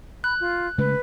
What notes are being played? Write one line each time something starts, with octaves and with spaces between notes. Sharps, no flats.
B5 F#6
F4
C#3 G#3 A3 B4